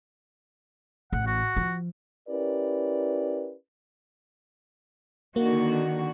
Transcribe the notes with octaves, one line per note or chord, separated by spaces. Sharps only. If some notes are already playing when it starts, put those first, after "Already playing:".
A1 F#5
F#4
F3
C#4 E4 G4 A#4 B4 D5
D3 D#3 A#3 F#4